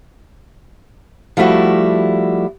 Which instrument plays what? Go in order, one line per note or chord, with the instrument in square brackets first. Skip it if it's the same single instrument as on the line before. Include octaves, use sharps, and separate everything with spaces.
[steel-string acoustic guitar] F3 G3 A3 E4 F#4